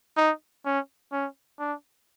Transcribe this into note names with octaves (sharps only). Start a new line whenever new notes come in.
D#4
C#4
C#4
D4